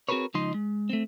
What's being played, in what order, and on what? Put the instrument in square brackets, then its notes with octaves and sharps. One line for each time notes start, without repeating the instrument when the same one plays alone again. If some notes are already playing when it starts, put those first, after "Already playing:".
[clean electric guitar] C4 F#4 G#4 A#4 B4 C#5
C#2 F3 D#4 D#5 C6
G#3
A3 C4